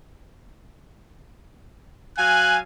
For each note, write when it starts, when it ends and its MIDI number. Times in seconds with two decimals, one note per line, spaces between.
2.18 2.59 54
2.18 2.59 77
2.18 2.59 80
2.18 2.58 90